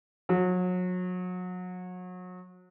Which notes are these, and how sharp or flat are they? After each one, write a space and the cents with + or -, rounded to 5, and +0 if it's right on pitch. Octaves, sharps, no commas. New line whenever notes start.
F#3 -30